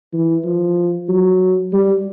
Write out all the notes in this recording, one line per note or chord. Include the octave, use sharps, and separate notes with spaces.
E3
F3
F#3
G3